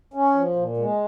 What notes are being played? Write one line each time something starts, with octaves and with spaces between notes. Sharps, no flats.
C#4
F3
A#2
G#3